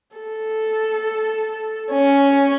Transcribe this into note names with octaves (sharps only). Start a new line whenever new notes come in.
A4
C#4